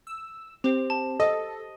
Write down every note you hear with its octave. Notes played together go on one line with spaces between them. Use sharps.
E6
C4 G4 C5
A5
A4 D#5